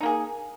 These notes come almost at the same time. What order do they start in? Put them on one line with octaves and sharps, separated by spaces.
D#4 A#3 G#4